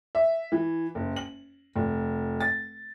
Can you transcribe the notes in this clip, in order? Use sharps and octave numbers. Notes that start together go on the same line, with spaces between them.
E5
E3
F#1
F#7
F1
A6